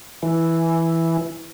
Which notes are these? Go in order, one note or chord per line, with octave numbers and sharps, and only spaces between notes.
E3